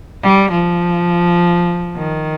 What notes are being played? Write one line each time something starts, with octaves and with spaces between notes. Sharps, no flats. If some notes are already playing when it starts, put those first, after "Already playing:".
G3
F3
D#3